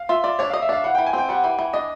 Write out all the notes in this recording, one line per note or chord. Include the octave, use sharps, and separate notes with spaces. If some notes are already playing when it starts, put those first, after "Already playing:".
Already playing: F5
F4 E5
F4 D5
D4 C#5
F5
D#5
E5
D4 F5
E3 F#5
G5
E3
G#5
C4 G5
G3 F#5
E3
E3
D4 D#5